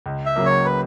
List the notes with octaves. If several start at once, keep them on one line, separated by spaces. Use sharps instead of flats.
C#2
E5
C#3 F#3 A#3
C#5
B4